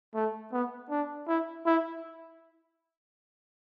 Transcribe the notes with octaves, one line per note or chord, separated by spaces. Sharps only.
A3
B3
D4
E4
E4